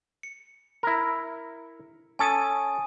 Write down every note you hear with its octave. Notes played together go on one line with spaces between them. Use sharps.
C#7
E4 A#4
C#4 A4 G#5 D#6 D#7